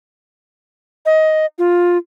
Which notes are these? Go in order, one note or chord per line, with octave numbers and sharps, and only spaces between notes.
D#5
F4